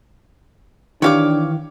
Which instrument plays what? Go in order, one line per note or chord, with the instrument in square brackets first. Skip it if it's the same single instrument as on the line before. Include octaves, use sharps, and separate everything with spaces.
[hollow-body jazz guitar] D#3 E3 G4 [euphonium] D4 [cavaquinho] C#5 F5 D6